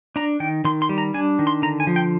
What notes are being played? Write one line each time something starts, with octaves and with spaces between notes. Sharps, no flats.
D4 A#5
D#3 G5
D#3 C6
C6
G3
A#5
D4 G#5
D#3
C6
D3 A#5
G#5
F3
G5